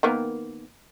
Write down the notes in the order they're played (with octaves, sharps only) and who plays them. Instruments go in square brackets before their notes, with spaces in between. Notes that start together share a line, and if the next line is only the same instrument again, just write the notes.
[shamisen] D#3 A#3 B3